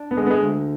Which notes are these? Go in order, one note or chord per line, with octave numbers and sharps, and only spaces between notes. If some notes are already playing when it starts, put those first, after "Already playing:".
Already playing: D4
B3
D3 G#3
B3
G#3
D2